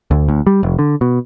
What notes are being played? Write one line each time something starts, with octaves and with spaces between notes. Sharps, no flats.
D2
D2
G3
F1
D3
B2